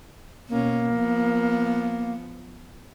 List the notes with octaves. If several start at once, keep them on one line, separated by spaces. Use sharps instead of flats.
B2 A#3 C#4
F3 B3